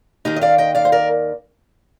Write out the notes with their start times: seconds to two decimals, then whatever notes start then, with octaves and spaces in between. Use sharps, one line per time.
0.25 D#2 D#3 D#4 G4
0.36 D#5
0.41 D5 F5
0.58 D#5 G5
0.75 D5 F5
0.85 C5
0.92 A#4 D5